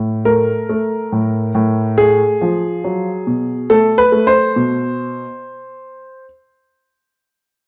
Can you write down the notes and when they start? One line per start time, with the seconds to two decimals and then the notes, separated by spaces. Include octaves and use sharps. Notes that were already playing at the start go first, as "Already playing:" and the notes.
Already playing: A2
0.25 A3 A#4
0.69 A3
1.12 A2
1.55 A2
1.98 A3 G#4
2.41 F3
2.84 F#3
3.27 B2
3.70 A3 A4
3.98 B4
4.12 A3
4.27 C5
4.56 B2